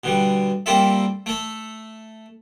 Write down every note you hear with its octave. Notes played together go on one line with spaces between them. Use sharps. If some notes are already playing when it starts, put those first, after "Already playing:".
B2 D3 G3
G3 A#3 C4 F4 A4 E5
A3 A4